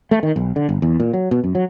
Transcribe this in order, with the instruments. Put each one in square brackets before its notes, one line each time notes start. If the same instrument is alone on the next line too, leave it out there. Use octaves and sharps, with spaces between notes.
[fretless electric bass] A3
D#3
B1
D3
G1
E2
A#2
F#3
B2
F#2
F#3